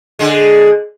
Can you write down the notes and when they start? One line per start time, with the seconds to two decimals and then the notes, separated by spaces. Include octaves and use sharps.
0.19 D3 G#3